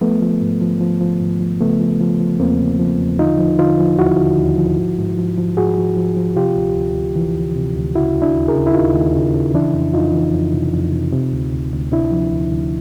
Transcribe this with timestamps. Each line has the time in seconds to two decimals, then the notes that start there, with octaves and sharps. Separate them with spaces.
0.01 F3 A3 B3
0.22 F3
0.41 G#2
0.61 F3
0.81 F3
1.01 F3
1.21 G#2
1.40 F3
1.61 C#3 A3 B3
1.80 F3
2.00 F3
2.20 F3
2.40 E2 A#3 C4
2.60 C#3
2.79 F3
2.99 E2
3.19 D3 D#4 F4
3.39 F3
3.59 D3 D#4 F4
3.79 F3
3.98 D#2 E4 F#4
4.19 D3
4.39 D#2
4.58 F3
4.78 G#2
4.98 G#2
5.18 F3
5.38 F3
5.57 G#2 F#4 G#4
5.78 F3
5.97 F3
6.17 F3
6.36 C3 F4 G4
6.56 D2
6.77 D2
6.96 D2
7.16 E3
7.36 D2
7.56 C3
7.76 D2
7.95 C#3 E4 F#4
8.16 D#2
8.22 D4 E4
8.36 D#2
8.48 G#4 A#4
8.55 C#3
8.67 E4
8.74 D#2 D#4 F4
8.95 D#2
9.14 C#3
9.34 C#3
9.54 E3 D4 E4
9.74 F2
9.94 F2 D#4 F4
10.13 E3
10.33 F2
10.53 C3
10.73 F2
10.93 C3
11.13 C3
11.33 D2
11.53 D2
11.73 D2
11.92 C3 D4 E4
12.12 F3
12.32 D2
12.52 D2